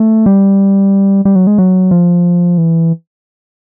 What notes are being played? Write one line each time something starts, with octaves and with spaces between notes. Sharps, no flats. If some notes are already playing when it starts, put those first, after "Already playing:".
Already playing: A3
G3
G3
F#3
G#3
F#3
F3
E3